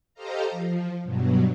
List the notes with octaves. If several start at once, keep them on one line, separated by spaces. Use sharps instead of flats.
G4 A4 C5 D#5 F5 A#5
F3
G2 B2 F#3